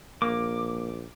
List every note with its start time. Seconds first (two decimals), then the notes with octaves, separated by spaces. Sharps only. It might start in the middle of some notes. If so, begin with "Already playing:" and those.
0.22 A#1 A#3 D6